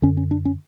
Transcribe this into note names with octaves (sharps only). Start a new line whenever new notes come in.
F#2 D3 C#4
C#4
D4
C#4